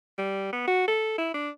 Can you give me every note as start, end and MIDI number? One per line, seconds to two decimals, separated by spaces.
0.18 0.51 55
0.53 0.65 59
0.67 0.87 66
0.88 1.16 69
1.18 1.34 64
1.34 1.50 62